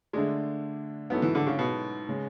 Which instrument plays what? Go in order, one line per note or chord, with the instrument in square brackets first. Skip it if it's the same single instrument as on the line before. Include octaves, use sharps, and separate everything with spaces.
[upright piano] D3 A3 D4 [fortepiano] G#3
[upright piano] G#2 F#3 C#4 E4 A4 [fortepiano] B3
[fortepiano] E3
D3
C#3
B2
[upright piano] C#3 G#3